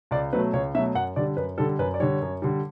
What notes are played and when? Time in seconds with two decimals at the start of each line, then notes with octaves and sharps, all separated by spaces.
0.11 C#2 D5
0.33 B2 F#3 A3 B4
0.53 C#2 C#5
0.75 B2 F#3 A3 E5
0.95 F#2 F#5
1.16 D3 G3 D5
1.37 F#2 B4
1.58 D3 G3 A4
1.79 F#2 B4
1.94 D5
2.00 D3 G3 C#5
2.22 F#2
2.42 D3 G3